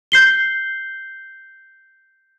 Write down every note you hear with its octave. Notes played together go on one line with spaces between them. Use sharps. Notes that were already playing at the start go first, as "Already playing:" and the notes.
G6 C7 G7